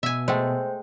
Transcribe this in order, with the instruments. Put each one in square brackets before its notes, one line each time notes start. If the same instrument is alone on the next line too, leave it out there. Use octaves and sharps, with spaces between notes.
[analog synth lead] B2 [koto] E5 G#5
[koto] G#3 A3 [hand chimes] C5 G5